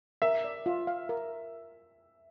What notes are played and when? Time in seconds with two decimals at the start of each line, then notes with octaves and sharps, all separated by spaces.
0.22 A#4 E5
0.44 D5
0.66 F4
0.87 F5
1.09 A#4